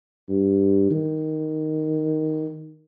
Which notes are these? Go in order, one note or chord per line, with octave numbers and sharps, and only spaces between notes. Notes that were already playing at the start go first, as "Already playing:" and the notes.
G2
D#3